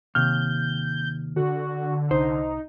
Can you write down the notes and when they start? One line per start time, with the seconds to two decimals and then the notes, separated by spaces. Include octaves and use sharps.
0.15 D#2 C3 F6 G6
1.36 D3 F#4
2.11 C2 D#4 C5